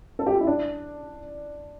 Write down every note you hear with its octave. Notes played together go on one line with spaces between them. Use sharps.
A4
G4
F4
E4
D4